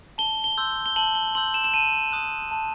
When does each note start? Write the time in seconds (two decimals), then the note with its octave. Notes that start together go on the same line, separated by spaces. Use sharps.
0.18 A5 G7
0.44 G7
0.58 C6 E6 G6
0.86 G7
0.96 A5 F#7
1.15 G7
1.35 C6 E6 G6 F#7
1.54 E7
1.64 E7
1.74 A5 D#7
2.12 D#6 F#6
2.51 A5